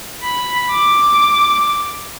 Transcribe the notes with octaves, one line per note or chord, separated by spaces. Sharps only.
B5
D6